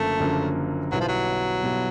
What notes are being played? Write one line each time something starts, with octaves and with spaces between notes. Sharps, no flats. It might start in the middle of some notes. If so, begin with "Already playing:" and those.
Already playing: F#1 F#2 D3 F3 A3 A#3
F#1 F#2 D3 F3 A#3
B1 B2 F#3 G3 B3 E4
F3
F#3
B1 B2 G3 B3 E4